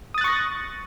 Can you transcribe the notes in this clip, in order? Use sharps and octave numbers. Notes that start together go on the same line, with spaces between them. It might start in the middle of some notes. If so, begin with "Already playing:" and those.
C#6 D#6 F#6 A6 A#6